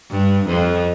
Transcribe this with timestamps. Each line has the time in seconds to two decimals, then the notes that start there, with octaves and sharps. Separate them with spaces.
0.11 G2
0.47 F2